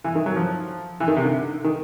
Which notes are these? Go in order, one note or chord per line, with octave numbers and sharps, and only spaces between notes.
E3
D#3
F#3
F3
E3
D#3
C3
D3
D#3